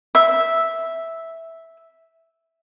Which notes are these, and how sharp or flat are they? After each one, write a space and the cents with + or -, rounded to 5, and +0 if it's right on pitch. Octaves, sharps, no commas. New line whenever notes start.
E5 -5